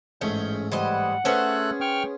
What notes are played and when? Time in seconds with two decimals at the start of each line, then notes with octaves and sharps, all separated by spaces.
0.21 A1 G#2 A3 C#4 G#4 G6
0.72 E3 G3 C5 D#5 F#5
1.25 A3 B3 C#4 G#4 A4 C5 F#6
1.81 G5 C#6 F6